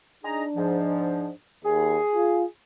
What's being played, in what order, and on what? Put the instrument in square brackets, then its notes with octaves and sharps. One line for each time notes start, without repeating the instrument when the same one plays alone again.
[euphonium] D4 [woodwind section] D#4 G#4 A#5
[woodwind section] G#2 F3
[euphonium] D#2 [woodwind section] G#4
[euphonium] F4